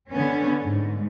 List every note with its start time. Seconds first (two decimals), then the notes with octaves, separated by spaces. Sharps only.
0.11 D3 B3 C#4
0.64 G#2